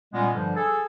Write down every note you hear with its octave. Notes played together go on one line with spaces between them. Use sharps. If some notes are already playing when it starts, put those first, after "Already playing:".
A#2 G3 G#3 B3 C#4
G2 D3 F3 G3
G#4 A4